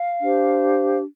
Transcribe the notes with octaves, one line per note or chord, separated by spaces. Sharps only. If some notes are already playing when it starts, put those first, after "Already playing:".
Already playing: F5
D4 G4 C5